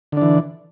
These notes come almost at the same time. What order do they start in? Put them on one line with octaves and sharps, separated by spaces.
D3 D4 E3